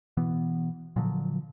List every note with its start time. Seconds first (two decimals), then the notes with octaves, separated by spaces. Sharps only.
0.17 B2 E3 B3
0.96 A#2 D3 F3 F#3